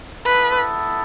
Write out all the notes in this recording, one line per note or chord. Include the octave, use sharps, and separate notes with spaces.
B3 E4 A4 B4